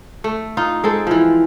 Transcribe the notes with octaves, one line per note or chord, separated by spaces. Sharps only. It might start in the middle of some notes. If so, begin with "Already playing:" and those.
A3
D#4 F4
G#3 C4 A4
E3 F3